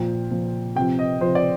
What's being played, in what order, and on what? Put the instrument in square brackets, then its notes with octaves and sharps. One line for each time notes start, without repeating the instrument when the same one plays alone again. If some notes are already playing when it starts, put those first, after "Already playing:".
Already playing: [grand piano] A#2 F3 G5
A#2 F3
C3 F3 G5
D#5
C3 F3 C5
D5